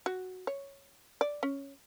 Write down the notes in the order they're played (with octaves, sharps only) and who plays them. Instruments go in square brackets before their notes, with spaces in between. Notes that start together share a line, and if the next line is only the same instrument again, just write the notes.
[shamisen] F#4
C#5
D5
C#4